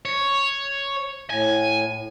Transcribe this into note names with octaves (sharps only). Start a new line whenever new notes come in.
C#5
A2 G#5